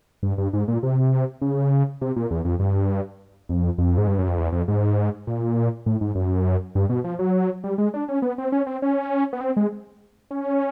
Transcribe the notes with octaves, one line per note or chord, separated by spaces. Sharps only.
G2
G2
G#2
A#2
C3
C#3
C3
A#2
E2
F2
G2
F2
F2
G#2
G2
F#2
F2
E2
F2
G#2
A#2
A2
G#2
F#2
G2
B2
F3
F#3
G3
G#3
D4
C#4
B3
C4
C#4
C4
C#4
B3
C4
G#3
C#4